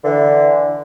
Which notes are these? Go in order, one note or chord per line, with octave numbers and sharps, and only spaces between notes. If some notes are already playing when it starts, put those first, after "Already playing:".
D3 E3